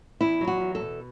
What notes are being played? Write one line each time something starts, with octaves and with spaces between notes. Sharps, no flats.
E2 E4
F#3
F#4
E2
A4
B2